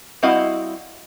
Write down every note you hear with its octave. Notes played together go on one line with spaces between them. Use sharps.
G3 C4 E4 F#4 D#5 F5